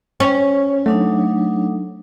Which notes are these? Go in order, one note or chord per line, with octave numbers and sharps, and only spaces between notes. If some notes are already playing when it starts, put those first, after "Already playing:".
C#4
F#3 A3 D4 D#4